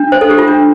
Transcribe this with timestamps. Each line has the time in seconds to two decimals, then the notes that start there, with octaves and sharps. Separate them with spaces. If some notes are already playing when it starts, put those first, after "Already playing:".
Already playing: D4
0.12 C5
0.21 A4
0.31 G4
0.39 F4
0.48 D4